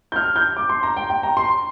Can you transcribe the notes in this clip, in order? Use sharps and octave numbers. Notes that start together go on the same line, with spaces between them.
G6
F6
G6
D6
C6
A#5
G5
G5
A#5
C6